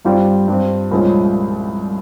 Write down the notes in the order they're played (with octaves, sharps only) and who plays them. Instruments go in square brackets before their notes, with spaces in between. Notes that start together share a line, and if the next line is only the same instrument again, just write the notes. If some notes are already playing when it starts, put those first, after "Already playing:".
[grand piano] G2 G3 C4 F4
G2 G3 C4
C2 A#2 F3 G#3 C#4